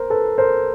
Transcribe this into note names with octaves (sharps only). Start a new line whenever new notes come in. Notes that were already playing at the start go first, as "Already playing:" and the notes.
Already playing: A#4 C5
A4 B4
A#4 C5